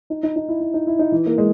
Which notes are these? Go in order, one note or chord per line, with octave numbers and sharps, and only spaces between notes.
D#4
D#4
D#4
E4
E4
D#4
E4
D#4
E3
A#3
G#3